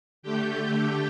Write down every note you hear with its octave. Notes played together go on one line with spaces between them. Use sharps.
D3 A3 G4 G5